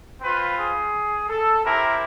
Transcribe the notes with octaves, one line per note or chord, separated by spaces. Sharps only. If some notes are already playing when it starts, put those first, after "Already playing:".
C4 F4 B4
G#4
A4
C4 E4 G4 A#4